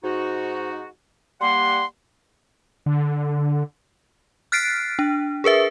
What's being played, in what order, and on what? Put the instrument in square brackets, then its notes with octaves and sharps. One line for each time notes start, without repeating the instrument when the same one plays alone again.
[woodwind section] G#2 D#4 F#4
[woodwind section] G3 A#3 F#5 [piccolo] C6
[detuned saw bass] D3
[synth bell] F6 F#6 A6 B6 C7 D7
D4
G#4 A#4 B4 E5